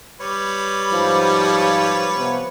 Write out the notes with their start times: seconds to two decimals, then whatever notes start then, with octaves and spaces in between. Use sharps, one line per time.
0.21 G3 B4 C#5
0.92 G#2 F3
2.16 C3 F3 B3